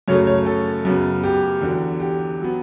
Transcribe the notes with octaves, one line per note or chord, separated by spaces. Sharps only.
F#2 C#3 F#3 A3 C#5
C#5
A4
F#2 C#3 F#3 B3
G4
E2 D3 F#3
G4
F#3 B3